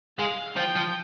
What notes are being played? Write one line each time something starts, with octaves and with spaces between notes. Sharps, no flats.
G#3 F5
F3 G5
F3